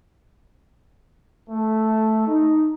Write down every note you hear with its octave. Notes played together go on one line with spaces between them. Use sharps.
A3
D#4